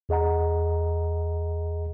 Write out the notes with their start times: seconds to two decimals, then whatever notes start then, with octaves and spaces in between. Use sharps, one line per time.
0.09 E2 G#4 D#5 F#5 A#5